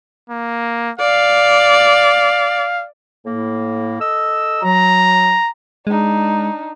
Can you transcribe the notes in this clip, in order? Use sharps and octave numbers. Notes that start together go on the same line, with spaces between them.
A#3
D5 F5
A2 A#3
A4 D#5 E6
F#3 A#5
G#3 D4 D#4